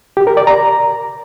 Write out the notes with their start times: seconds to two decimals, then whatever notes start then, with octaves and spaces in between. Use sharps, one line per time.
0.17 G4
0.27 A#4
0.37 D5
0.47 A#5